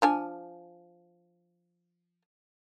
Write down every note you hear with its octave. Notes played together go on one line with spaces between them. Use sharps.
F3 D4 G#5